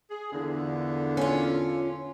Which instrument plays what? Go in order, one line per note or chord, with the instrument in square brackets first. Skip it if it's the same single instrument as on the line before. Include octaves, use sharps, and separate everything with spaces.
[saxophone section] G#4
E2 A#2 D3
[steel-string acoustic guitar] C#4 F4